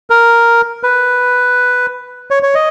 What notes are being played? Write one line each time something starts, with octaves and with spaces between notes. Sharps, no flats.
A#4
B4
C#5
C#5
D#5